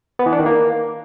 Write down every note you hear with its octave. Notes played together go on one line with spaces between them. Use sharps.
B3
E3
D4
D#3
A#3